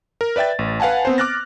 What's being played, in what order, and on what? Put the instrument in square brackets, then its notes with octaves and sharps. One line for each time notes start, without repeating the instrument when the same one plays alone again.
[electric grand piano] A#4
B4 D5 E5 G5 A6
A1
B4 F5 F#5 G#5 A5
B3 C4 C5
D6 F6 F#6 A6 A#6